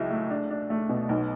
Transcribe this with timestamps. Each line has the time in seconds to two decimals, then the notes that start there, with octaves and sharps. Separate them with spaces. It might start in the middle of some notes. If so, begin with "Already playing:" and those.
Already playing: C#2 F#3 E4
0.11 A3
0.30 D4
0.50 D4
0.70 A3
0.89 B2
1.09 B1